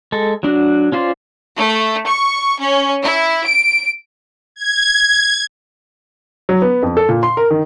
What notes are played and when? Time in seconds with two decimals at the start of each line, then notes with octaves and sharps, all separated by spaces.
0.12 G#3 A4
0.43 F#3 D4 F#4
0.92 C#4 F4 C5 D5
1.56 A3
2.07 C#6
2.59 C#4
3.02 E4
3.45 D7
4.55 G#6
6.49 F#3
6.62 B3
6.83 F2
6.97 A4
7.09 A#2
7.23 C6
7.37 A#4
7.51 D#3